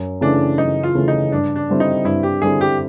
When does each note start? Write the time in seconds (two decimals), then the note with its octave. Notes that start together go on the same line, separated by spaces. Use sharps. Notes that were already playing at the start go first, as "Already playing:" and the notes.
Already playing: F#2
0.21 C#3 E3 A3 C#4 D4
0.58 F#2 D#4
0.83 F4
0.95 C#3 E3 A3 C#4
1.08 D#4
1.31 G2 D4
1.56 D4
1.68 D3 G3 C4 E4
1.80 D#4
2.05 G2 E4
2.23 G4
2.42 D3 G3 C4 E4 G#4
2.61 G4